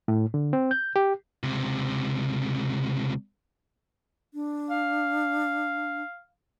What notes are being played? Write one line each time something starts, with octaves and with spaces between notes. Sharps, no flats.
A2
D3
C4
G6
G4
C#2 C3
D4
F5